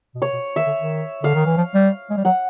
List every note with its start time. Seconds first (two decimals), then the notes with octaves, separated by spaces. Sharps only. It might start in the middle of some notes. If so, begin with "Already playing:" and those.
0.15 B2
0.22 C3 C#5
0.33 B2
0.56 D#3 E5
0.67 D3
0.79 D#3
1.23 D3 F5
1.34 D#3
1.46 E3
1.57 F3
1.74 G3
2.10 G#3
2.17 G3
2.25 F#3 F#5